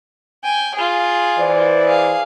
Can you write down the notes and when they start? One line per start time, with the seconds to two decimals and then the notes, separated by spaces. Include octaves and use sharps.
0.44 G5 G#5
0.75 F4 G#4
1.38 E3 C5 D5
1.84 G#4 F5